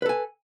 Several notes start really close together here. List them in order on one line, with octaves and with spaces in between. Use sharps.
B4 A4 G#5